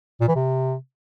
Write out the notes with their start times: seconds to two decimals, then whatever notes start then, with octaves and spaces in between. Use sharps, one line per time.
0.21 A#2
0.28 E3
0.36 C3